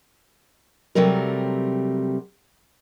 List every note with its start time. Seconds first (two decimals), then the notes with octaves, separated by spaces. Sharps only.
0.95 C3 F#3 G3 A3 C4 A#4